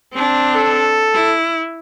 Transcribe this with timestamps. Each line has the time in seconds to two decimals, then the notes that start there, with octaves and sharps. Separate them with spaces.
0.14 C4 D4
0.55 A4
1.15 E4